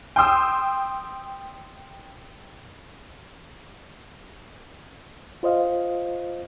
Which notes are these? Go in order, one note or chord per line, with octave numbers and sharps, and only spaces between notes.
G5 C6 D#6 E6
F4 C5 D#5 F5